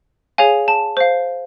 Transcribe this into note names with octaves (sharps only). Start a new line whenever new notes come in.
G#4 C#5 F5 G#5
A5
C5 F5